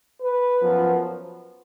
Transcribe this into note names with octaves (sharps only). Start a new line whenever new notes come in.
B4
F#2 F3 B3